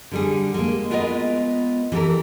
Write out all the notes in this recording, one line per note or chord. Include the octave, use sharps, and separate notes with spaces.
D3 G3 G#4
G#3 A#3
G#3 B3 F4 A#4 B4 D#5
E3 G4 A4 A#4